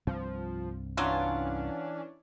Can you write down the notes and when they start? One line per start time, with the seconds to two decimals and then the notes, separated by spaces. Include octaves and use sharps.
0.07 C2 G2 F3 C4
0.97 E3 F#3 C#4 D4 F4